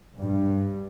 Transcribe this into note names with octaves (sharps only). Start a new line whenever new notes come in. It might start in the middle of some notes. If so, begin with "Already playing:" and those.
G2